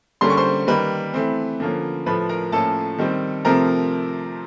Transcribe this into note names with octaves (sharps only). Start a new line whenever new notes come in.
D3 G3 A#3 C#4 C6
C#6
C5 C6
D#3 G3 A#3 B4 B5
E3 A3 C4
D3 F3 A#3 C#4
A2 F3 A3 B4 B5
A#4 A#5
A2 F3 A#3 C#4 A4 A5
D#3 G3 C4
C3 F3 A3 C4 A#4 A#5